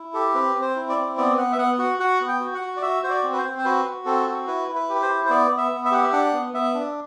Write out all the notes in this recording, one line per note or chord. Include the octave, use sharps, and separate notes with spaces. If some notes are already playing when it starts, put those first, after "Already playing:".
Already playing: E4
G4 A4
C4 B4
C4
C5
E4
D5
C4
B3 D5
B3 F#5
E5
B3 F#5
F#4 F#5
F#4 F#5
B3
G5
F#4
F#5
F#4
D5
F#4 E5
F#4 C5
D5
C4
B4
C5
C4
C5
F#4 B4
F#4
C4 A4
F#4
E4 B4
E4
B4
G4
B4
C5
E4
C5
B3 D5
B3
E5
B3
E5
G4 F#5
E5
D4 F#5
B3
B3 E5
D4